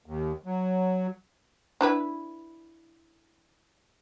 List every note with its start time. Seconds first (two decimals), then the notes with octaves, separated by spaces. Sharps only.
0.06 D#2
0.45 F#3
1.81 D4 E4 B4